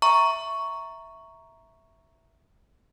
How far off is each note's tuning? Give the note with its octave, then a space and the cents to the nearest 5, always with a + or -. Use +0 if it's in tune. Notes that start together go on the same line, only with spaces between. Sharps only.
E5 +0 A#5 +0 C#6 +0